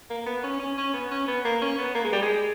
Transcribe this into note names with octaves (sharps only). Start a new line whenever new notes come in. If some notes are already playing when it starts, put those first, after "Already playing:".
A#3
B3
C#4
C#4
C#4
B3
C#4
B3
A#3
C#4
B3
A#3
G#3
G3
G#3